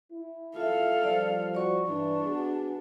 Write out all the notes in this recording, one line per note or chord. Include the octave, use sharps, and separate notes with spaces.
E4
F4 A4 E5 F5
F3 G3 D5
F#4 D5 C#6
G2 E3 D4
B3 F#4 G#4